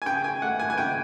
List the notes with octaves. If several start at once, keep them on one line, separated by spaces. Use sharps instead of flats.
G#5
C#3 G5
G#5
A3 F#5
G#5
G#5
C#3 G5